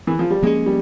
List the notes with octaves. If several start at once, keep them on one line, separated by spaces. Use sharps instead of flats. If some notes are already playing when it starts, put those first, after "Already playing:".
E3
F3
G3
F3 G#3 A#3 C#4
G3